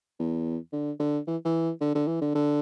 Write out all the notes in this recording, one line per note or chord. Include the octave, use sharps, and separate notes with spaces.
E2
D3
D3
E3
E3
D3
D3
E3
D3
D3